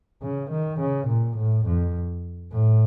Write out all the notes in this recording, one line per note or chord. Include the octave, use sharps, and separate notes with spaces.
C#3
D#3
C#3
A#2
A2
F2
A2